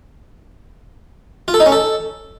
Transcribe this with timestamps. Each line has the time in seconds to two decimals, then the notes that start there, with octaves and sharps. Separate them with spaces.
1.48 F4
1.54 A4
1.60 D#4
1.66 C#4
1.72 A4